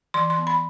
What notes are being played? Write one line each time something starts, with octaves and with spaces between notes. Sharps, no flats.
E3 C6
C6
B3
B5